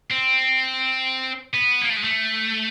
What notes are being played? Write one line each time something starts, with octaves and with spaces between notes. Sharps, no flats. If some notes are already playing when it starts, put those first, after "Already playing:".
C4
B3
A#3
A3
G#3
A3